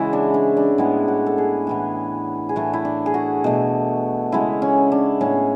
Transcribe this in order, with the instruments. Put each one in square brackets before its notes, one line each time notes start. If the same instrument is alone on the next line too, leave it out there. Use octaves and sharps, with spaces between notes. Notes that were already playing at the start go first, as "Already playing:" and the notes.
Already playing: [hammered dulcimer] C#3 E3 G#3 E4 F#4
D4
D4
D4
A2 G#3 B3 E4
F#4
A4
G#4
A2 E3 B3
G#4
A2 E3 A3 F#4
E4
D4
G#4
F#4
B2 A3
C#3 G#3 B3 E4
C#4
D4
A2 G#3 B3 C#4